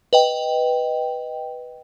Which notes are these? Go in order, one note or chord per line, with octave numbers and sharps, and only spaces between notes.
B4 D#5 G5